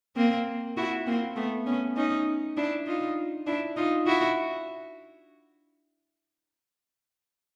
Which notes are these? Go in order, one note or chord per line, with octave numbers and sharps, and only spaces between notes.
A#3 C4
E4 F#4
A#3 C4
A3 B3
B3 C#4
C#4 D#4
D4 E4
D#4 F4
D4 E4
D#4 F4
E4 F#4